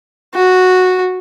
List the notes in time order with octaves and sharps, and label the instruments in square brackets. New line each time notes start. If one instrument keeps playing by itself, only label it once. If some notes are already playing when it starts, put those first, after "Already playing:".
[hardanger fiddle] F#4